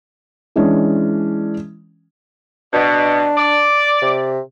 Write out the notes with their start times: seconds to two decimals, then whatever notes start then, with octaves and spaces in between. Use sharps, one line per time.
0.56 E3 G#3 C#4 D4
2.73 B2 D4
3.38 D5
4.02 C3